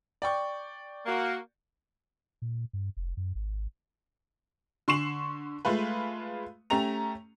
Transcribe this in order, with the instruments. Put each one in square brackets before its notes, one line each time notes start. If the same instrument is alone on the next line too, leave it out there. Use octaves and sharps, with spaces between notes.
[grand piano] D5 G5 C#6
[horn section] A#3 F#4
[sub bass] A#2
G2
F1
F#2
G#1
[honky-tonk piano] D3 C6 C#6 C7 E7 F#7
G#3 A3 F4 B4
A3 C#4 G4 A#5 F7